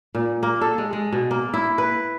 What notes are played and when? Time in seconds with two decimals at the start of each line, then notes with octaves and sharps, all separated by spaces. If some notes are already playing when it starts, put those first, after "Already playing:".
0.15 A#2
0.43 A#3
0.61 A4
0.78 G#3
0.93 G#3
1.13 B2
1.31 A#3
1.54 E4
1.78 B4